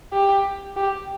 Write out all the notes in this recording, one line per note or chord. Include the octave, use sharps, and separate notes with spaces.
G4
G4